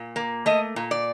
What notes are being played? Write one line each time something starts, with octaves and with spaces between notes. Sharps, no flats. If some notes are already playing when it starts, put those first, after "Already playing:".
Already playing: A#2
A#3
A3 D#5
A#2
D5